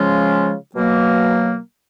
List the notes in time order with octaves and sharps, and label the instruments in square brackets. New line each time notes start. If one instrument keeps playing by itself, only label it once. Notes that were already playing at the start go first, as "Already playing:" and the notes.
Already playing: [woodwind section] C#3 F3 G#3 C#4 F4
B2 F#3 A#3